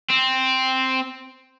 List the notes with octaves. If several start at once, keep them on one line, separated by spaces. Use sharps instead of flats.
C4